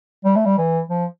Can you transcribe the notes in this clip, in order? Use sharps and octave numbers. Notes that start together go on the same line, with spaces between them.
G3
A3
G3
E3
F3